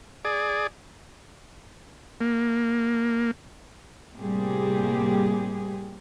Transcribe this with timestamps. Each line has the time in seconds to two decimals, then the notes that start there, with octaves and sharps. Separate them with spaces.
0.25 G#4 D5
2.21 A#3
4.15 A2 C3 G3 A#3 G4 G#4